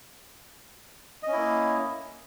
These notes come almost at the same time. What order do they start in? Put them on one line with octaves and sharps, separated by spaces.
D#5 C#4 E4 A#3